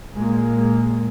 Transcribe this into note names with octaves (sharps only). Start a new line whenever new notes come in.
A#2 G#3 A#3